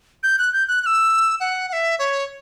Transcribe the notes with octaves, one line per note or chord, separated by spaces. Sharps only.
G6
F#6
G6
F#6
F#6
E6
F#5
F#5
E5
C#5